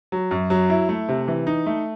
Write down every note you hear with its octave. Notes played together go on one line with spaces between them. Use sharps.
F#3
F#2
F#3
E4
A3
C3
E3
D#4
A3